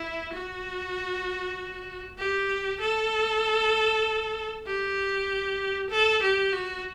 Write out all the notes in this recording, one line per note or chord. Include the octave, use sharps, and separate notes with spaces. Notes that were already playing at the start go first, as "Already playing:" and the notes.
Already playing: E4
F#4
G4
A4
G4
A4
G4
F#4